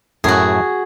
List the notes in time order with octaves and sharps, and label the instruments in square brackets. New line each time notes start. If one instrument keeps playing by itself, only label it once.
[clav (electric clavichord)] F#2 A2 [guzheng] F#4 G#4